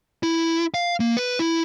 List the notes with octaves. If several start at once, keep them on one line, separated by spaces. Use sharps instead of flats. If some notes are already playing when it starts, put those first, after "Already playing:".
E4
F5
A#3
B4
E4